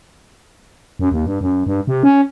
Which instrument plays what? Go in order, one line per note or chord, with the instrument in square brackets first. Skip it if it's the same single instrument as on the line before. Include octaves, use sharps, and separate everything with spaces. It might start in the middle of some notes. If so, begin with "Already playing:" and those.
[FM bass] F#2
D#2
G2
F#2
G2
C3
C#4